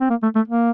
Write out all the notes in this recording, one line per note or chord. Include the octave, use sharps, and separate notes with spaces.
C4
A#3
A3
A3
A#3